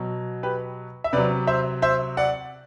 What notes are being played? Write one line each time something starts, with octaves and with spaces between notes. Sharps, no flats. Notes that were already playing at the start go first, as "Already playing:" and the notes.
Already playing: B2 F#3
G4 B4
E5
C3 F#3 B4 D5
C5 E5
C5 E5
D5 F#5